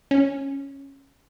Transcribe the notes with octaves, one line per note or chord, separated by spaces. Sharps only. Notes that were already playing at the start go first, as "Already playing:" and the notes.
C#4